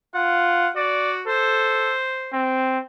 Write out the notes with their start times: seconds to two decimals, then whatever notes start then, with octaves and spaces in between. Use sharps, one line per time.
0.15 F4 F#5
0.76 F#4 D5
1.27 A4 C5
2.33 C4